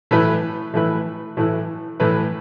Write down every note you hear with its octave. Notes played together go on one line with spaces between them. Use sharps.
A2 E3 A3 E4 B4
A2 E3 A3 E4 B4
A2 E3 A3 E4 B4
A2 E3 A3 E4 B4